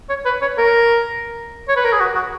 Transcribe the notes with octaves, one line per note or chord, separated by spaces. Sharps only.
C#5
B4
C#5
A#4
C#5
B4
A#4
G#4
F#4
F#4